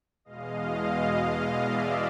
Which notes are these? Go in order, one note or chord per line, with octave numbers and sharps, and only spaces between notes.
E2 B2 G#3 D#5 F5
D5 E5